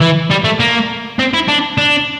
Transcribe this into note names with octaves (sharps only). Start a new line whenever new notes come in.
E3
G3
A3
A#3
C4
E4
D4
D4